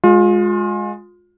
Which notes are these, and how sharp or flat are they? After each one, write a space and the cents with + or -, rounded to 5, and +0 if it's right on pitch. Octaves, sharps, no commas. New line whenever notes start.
G#3 +0 F4 +30